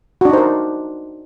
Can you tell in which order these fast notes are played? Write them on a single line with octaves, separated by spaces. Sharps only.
F#4 D4 D#4 C5 A#4